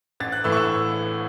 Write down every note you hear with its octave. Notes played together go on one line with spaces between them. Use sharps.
A1 A6
F#6
A2 E3 A3 E6
C#6
E6